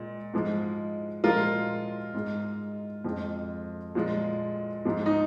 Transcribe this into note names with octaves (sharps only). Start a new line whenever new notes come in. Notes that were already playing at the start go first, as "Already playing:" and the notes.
Already playing: A#2 G#3
G#2 F3 G#3
A#2 F3 G#3 F4 A#4
G#2 G#3
F2 F3 G#3
A#2 F3 G#3
G#2 F3 G#3
D#4